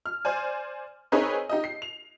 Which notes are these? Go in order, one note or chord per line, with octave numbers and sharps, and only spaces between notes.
F6
C5 D5 G#5
C4 D#4 G#4 A#4 B4 C#5
D#4 G4 D#5
C7
F7